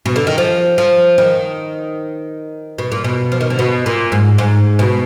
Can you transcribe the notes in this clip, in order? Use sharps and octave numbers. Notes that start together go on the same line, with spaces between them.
B2
D3
D#3
F3
F3
D#3
B2
A#2
B2
F3
D#3
D3
B2
A#2
G#2
G#2
B2